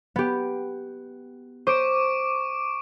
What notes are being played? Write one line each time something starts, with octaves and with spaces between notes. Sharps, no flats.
B3 G4
C5 C#6 D6 D7